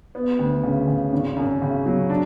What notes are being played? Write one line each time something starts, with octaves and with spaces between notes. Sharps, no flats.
B3
D2
C#3
C#3
G#1
F#2
C#3
F#3
D4